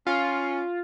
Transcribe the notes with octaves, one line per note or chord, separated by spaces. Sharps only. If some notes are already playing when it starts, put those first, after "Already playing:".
C#4 F4